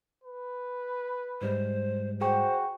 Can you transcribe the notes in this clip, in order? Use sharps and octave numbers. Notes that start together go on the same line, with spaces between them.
B4
G#2 G3 G#3 C5
F#4 G#4 C5 G5 C#6